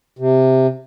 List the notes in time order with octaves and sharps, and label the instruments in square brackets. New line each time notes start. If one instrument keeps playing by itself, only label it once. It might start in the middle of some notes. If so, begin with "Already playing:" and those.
[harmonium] C3